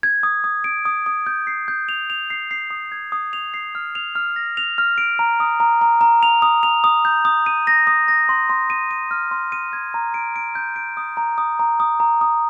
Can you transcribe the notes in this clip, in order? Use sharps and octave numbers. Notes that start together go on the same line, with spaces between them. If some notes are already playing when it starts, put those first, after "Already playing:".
G#6
D#6
D#6
D7
D#6
D#6
G6
C7
G6
F7
F7
C7
C7
D#6
G#6
D#6
F7
C7
F6
F7
F6
A#6
F7
F6
D7
A#5
D#6
A#5
A#5
A#5
F7
D#6
F7
D#6
G6
D#6
D#7
A#6
D#6
A#6
C6
C6
D#7
D#7
F6
C6
D#7
G#6
A#5
D7
D7
G6
D7
D#6
A#5
D#6
A#5
D#6
A#5
D#6